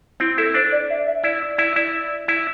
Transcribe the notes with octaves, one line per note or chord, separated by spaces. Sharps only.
C4 E4
E4 A4
D4 C5
D5
E5
E5
E4 D5
E4
E4 D5
E4